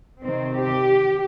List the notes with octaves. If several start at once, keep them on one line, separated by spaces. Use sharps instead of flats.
C3 D#3 C4
G4